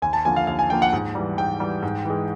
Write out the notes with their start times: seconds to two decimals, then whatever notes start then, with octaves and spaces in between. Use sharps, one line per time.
0.02 D#2 G#5
0.13 A5
0.25 D3 F3 A#3 G#5
0.36 F5
0.47 D#2 F5
0.59 G#5
0.70 D3 F3 A#3 G5
0.82 F#5
0.93 G#2
1.15 E3 G3
1.37 G#2 G5
1.60 E3 G3
1.82 G#2
2.05 E3 G#3